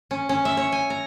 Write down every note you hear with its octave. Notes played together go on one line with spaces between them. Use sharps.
C#4
C#4
E5
C#5
G#5
A#5